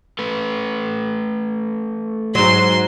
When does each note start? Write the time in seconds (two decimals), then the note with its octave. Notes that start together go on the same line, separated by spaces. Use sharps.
0.19 A3 B4
2.35 G#2 F#3 C6